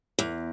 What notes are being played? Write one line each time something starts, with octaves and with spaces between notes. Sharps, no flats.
E2